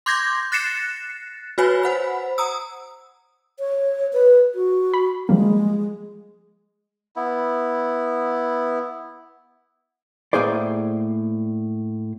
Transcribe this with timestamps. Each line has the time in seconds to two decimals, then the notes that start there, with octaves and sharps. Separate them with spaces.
0.06 C6 D6 G6 G#6 A#6
0.52 F#6 A6 A#6 C7 C#7 E7
1.58 F#4 B4 C#5 G#5 B5
1.83 C5 F#5 B5
2.38 A#5 D#6 E6
3.59 C#5
4.13 B4
4.55 F#4
4.94 B5
5.29 F3 G3 G#3 A#3
7.16 B3 E4
10.33 A2 A#3 F#4 G#4 C5 D5